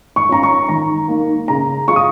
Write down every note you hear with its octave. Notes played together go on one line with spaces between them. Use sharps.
C#6
C#4 F4 A#5
C#6
D#3 A#5
A#3 D#4
C#3 A#5
G#3 F4 C#6
D#6